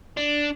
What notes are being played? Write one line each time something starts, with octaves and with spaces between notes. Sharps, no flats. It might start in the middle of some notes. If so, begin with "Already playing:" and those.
D4